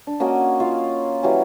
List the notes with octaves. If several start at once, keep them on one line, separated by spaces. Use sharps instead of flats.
D4
A#3 C#4 F#4 D#5
F4 F5
E3 F#3 G3 C#4